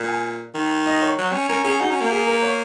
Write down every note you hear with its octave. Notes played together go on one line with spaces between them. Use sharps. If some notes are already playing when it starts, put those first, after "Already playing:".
Already playing: A#2
G#5
D#3
D#5
C#5
F#3
C#4
C#4 A#4
C#4 G#4
D#4 F#4
C#4
A#3
G#4
A#4
C#5